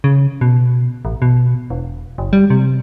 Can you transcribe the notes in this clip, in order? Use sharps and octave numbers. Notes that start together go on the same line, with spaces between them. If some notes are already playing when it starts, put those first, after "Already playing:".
C#3
B2
A1
B2
E1
F#1
G3
C3